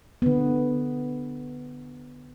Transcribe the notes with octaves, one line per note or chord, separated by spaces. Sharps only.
D3 B3